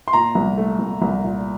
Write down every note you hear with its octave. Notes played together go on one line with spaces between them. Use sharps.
C6
A#2 A#5
C2
A3
C2
C2
A#2